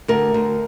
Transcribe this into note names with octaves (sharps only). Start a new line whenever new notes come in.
D2 A#4
D2